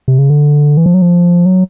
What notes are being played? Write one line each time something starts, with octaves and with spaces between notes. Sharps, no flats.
C3
C#3
D3
E3
F3
F#3
F3
F#3